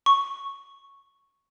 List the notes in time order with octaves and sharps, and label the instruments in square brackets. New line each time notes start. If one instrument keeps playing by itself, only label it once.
[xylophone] C#6